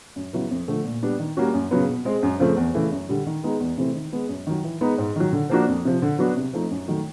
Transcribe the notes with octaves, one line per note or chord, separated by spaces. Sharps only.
F#2
C#3 F#3 B3 E4
F2
D3 F3 A3
A#2
G3 B3 D4
D#3
G3 A#3 C#4 F#4
F#2
C#3 F#3 B3
B2
G#3 C4
F#2
C#3 F3 A3 C4
E2
C#3 E3 A3
F#2
D3 G3
D#3
G#3 B3 D#4
E2
C3 E3 A3 C4
D#3
G#3 B3
F#2
D#3 F#3
E3
G#3 B3 D#4
G#2
D#3 F#3
D3
F3 A#3 D4 F#4
F2
C3 F3
D3
F#3 B3 D4 F#4
C3
F3 A3 C4 D#4
F#2
D#3 F#3 A3